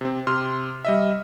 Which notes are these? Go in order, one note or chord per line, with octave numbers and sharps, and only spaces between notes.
C3 C4
C3 C6 F6
G3 D#5 E5